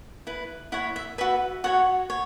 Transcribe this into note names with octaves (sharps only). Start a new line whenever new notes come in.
E4 B4
E4 C#5 F#5
E5
F#4 B4 E5
F#4 C#5 F#5
C#5